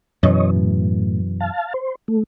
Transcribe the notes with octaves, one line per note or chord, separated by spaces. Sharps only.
F#2 B2 E3 C#5 D#5
A2
F5 A5
C5
A3